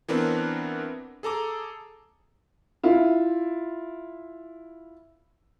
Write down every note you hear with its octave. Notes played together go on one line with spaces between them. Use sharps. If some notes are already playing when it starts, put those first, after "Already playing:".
E3 B3 C4 D4 A#4 B4
G#4 A4 A#5 D6
E4 F4